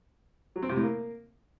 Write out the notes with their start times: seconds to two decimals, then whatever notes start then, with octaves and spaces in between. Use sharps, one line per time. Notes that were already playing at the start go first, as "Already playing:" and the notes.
0.56 F#3
0.62 C4
0.69 C3
0.76 A2
0.83 A#3